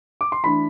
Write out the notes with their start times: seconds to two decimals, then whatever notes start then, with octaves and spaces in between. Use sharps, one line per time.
0.21 D6
0.32 C6
0.43 E3 A3 D4 B5